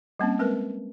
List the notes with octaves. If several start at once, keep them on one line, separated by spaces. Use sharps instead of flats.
G3 A#3 C4 C#4
G#3 C4 A#4 B4